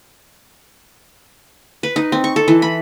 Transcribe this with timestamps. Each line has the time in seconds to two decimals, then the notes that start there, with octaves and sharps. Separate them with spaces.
1.83 B4
1.96 D#4
2.12 C4
2.24 C#6
2.36 A4
2.48 E3
2.62 B5